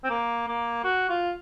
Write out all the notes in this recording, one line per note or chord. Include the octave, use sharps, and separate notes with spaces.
C4
A#3
A#3
F#4
F4